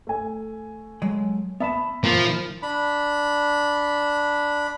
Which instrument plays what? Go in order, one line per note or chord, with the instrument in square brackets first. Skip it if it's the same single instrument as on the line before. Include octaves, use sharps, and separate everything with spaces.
[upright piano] A3 G#5
[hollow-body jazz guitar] F#3 G#3
[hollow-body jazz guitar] B3 A5 [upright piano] E5 B5
[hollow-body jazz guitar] A#2 E3 A#3 [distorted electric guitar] F3
[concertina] D4 B5